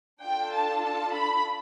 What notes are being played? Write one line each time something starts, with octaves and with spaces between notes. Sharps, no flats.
D4 F4 A4 G5
A5
A5
B5